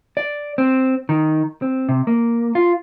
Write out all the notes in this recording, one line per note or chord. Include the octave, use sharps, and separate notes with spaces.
D5
C4
D#3
C4
C3
A#3
F4